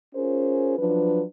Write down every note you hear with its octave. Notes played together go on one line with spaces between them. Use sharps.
C#4 F4 G#4 A#4 C5
F3 F#3 D4 B4